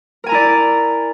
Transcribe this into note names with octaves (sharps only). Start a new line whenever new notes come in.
E4 A#4 D5 G#5 A#5